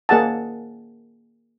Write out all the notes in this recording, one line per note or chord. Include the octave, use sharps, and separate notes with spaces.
A#3 G#4 F#5 A5